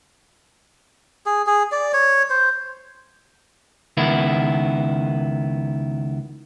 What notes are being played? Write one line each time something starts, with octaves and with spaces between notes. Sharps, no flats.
G#4
G#4
D5
C#5
C5
C#2 D#3 B3 E4